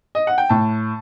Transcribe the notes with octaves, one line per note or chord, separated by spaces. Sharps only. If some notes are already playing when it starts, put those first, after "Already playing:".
D#5
F#5
G5
A2 A5